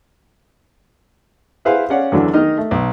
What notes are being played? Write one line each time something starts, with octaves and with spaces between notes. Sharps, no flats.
E4 G#4 B4 C5 F5 F#5
C#4 D5 F5 F#5
E2 D3 E3 F#3 D4
D#3 D#4 D#5 F6
A3
B1